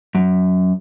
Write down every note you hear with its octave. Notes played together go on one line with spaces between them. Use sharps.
F#2